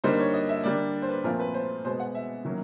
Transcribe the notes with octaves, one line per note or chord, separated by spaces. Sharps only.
D3 G3 A#3 D#4 C5
C#5
D#5
E5
D3 G3 A#3 D5
C5
B4
A#2 F3 A3 C4 F4 A#4
B4
C5
B2 G#3 B3 C5
F#5
E5
D#3 F#3 A#3 C#4 E4